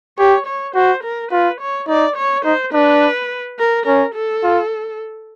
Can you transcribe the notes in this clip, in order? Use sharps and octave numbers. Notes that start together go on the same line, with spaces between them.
G4 C#5
C#5
F#4 C5
A#4
F4 B4
C#5
D#4 D5
C#5
D#4 C5
D4 B4
A#4
C#4 A#4
A4
F4